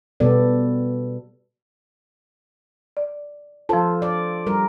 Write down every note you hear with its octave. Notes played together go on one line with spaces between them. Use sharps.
B2 G3 B3 A4 D5
D5
F3 F4 A4 C5 A5
D5
G3 A#4